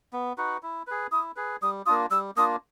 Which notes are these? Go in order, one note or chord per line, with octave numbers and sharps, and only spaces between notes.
B3
D#4 F#4 B4
E4
G#4 B4
E4 D#6
G#4 B4
G3 D#6
A#3 D4 F4 D#6
G3 E6
A#3 D4 F4 D#6